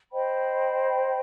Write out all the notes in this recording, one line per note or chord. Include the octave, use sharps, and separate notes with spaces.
C5 D#5 G5 B5